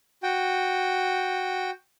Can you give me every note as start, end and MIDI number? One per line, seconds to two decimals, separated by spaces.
0.23 1.71 66
0.23 1.71 79